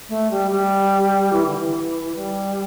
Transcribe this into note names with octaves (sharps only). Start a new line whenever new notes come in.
A3
G3
G3
E3
D3
E3
G3